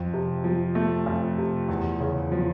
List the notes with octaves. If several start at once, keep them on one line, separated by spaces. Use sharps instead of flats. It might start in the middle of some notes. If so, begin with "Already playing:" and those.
Already playing: F2
C3
F3
A3
F2
C3
E2
C#3
F3